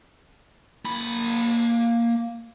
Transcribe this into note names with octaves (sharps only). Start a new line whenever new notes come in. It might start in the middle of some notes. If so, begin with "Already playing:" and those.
A#3 B5